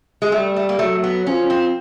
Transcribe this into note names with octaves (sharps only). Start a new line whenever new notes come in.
G#3
G3 A3
A3
A#3
F#3 A3
B3
F3 C#4
C4